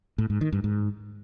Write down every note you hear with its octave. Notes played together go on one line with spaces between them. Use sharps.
A2
G#2
D#3
G2
G#2